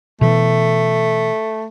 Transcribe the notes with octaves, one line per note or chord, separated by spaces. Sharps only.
B2 E3 A3